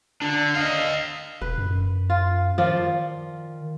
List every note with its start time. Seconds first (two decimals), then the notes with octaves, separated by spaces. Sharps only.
0.22 D3 D4
0.55 D#5 F5
1.42 E1 B4
1.58 F#2
2.10 F4
2.58 D#3 F3 F4 D5